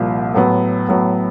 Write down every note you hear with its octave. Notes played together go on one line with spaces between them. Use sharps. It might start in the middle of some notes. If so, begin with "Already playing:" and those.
Already playing: C2 A#2 F3
A2 F#3 B3
A2 F#3 B3